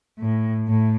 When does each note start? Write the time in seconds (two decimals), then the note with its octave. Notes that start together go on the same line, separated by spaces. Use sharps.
0.19 A2
0.67 A2